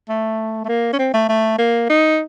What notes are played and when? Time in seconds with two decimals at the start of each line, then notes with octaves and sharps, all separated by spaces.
0.09 A3
0.65 A3
0.69 A#3
0.93 C#4
0.99 C4
1.14 A3
1.29 A3
1.58 A#3
1.90 D#4